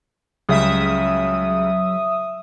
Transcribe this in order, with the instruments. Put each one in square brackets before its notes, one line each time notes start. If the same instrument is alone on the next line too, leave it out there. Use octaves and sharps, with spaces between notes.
[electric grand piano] C#2 C#3 G3 [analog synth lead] F#3 [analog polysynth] E5 D#6